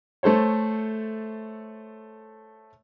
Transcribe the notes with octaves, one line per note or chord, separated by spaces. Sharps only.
A3 A4 C5 C#5